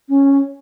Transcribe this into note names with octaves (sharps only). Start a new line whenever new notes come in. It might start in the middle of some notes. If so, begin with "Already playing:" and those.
C#4